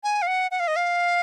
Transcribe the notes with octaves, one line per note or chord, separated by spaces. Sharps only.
G#5
F5
F#5
F#5
F5
D#5
F5